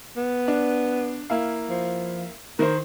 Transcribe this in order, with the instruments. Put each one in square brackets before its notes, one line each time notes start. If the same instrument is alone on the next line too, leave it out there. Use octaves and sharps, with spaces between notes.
[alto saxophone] B3
[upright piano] D4
A#3 E4 F5
[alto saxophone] F3
[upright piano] D#3 C5 [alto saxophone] A#4